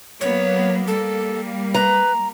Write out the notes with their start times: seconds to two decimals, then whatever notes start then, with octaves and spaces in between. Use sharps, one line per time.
0.21 F#3 A#3 B3 C#5
0.87 G3 A#3 A4
1.74 B4 A#5